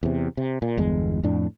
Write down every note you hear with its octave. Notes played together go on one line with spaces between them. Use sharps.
E2 C3
C3
A#2
G1 E2 G#3
F2 A2 D4